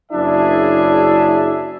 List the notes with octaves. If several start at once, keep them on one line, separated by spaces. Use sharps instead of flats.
F#1 F#3 D4 E4 G#4 E5